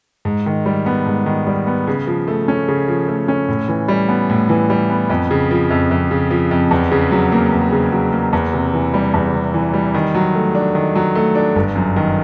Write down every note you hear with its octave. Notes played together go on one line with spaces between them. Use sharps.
G#2
D#3
G3
B3
G#2
D#3
G3
B3
C#3
F3
A3
C#4
C#3
F3
A3
C#4
A2
E3
G3
B3
A2
E3
G3
B3
F2
C#3
F3
F2
F2
C#3
F3
F2
E2
C#3
F#3
A#3
E2
C#3
F#3
A#3
E2
C3
E3
G3
E2
C3
E3
G3
D#3
F#3
A3
D4
D#3
F#3
A3
D4
G1
F#2
D#3